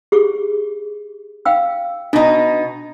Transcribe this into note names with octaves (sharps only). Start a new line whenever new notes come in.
G4 G#4 C#6
F5 G5 E6
B2 D4 D#4